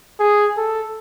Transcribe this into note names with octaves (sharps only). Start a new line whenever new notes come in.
G#4
A4